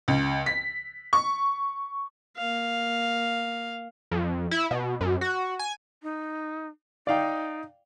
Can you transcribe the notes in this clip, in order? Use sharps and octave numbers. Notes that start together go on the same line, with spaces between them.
C#2
B6
C#6
A#3 F5
F2
E4
B2
F#2
F#4
G#5
D#4
D#4 D5 F5 G5